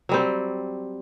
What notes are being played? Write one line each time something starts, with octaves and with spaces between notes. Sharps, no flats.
F#3 G3 C4